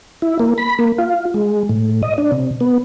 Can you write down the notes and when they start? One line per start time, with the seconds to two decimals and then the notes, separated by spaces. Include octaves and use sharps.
0.22 E4
0.39 A#3
0.58 B5
0.79 A#3
0.98 F4
1.34 G#3
1.69 A2
2.03 D#5
2.18 D4
2.32 C3
2.60 B3